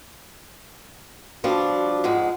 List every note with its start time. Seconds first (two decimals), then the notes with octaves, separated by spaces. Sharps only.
1.44 F3 G3 D4 F#4
2.04 F2 G#2 G#3 F#5